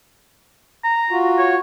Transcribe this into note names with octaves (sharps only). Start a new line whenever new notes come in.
A#5
F4 F#4
C#5